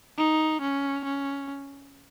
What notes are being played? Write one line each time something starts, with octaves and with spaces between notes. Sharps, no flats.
D#4
C#4
C#4